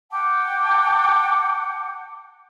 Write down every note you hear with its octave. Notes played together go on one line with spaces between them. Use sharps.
F#5 G5 A5 D6